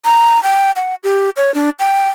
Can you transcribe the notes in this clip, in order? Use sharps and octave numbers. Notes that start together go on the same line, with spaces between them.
A#5
G5
F#5
G4
C#5
D4
G5